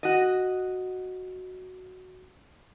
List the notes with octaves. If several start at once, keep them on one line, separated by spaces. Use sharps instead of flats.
F#4 D#5